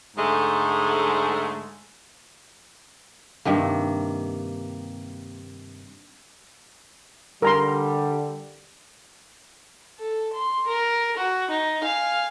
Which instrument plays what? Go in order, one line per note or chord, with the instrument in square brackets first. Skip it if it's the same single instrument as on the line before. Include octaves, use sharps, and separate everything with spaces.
[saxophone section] G#2 D3 G#3 A3
[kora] G2 C3 D#3 A#3
[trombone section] D3 G3 [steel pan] A#4 A#5 C6
[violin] A4
C6
A#4
F#4
D#4
F5 G#5